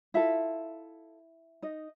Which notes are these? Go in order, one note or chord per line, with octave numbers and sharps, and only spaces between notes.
E4 F4 A4 E5
D#4 D#5